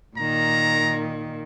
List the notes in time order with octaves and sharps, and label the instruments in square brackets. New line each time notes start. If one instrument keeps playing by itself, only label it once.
[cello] A#2 D#3 [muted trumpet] A#5